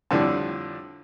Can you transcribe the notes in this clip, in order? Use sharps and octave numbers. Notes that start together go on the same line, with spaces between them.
F2 A2 D3 G3 D4